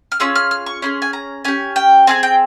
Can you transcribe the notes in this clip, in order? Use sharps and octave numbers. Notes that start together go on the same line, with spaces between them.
F6
C#4 F4 G#4 E6
F6
F6
C#6
C#4 E4 G#4 C6
G#5
A#5
C#4 G4 G#5
G5
C4 F4 G#4 G#5
G5